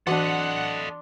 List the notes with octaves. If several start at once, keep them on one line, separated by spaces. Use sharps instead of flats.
E3 D4 F#4 A4 D#5 F#5 C6